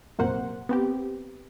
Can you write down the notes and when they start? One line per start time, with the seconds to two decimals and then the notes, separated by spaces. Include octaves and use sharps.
0.19 A#1 F#2 C3 A#3 C5 F#5
0.69 B3 C4 G4